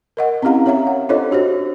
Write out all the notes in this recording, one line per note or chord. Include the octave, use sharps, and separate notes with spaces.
A#4 D#5 F#5
C4 C#4 E4 G4 F5 A#5
G4 C#5 E5 F5 A#5
F#5
D4 F4 A4 C5 C#5 D#5
D4 F#4 G4 C5